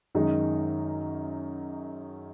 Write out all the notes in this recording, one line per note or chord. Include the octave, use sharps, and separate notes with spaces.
F#2 D#3 G#3 D#4